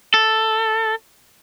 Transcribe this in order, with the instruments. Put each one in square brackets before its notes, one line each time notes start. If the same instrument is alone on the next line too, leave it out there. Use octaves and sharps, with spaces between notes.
[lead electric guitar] A4